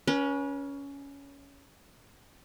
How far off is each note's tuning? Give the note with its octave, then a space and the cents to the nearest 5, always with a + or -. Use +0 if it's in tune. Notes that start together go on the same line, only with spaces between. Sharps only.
C#4 +15 B4 -35